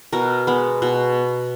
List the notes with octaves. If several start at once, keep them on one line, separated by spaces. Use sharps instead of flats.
B2 A#4
G#3 B3
B2